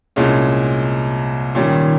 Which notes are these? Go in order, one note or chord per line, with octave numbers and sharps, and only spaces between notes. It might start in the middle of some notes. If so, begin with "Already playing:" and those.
C2 A#2 G#3 C#4
A#2 D#3 G3 C#4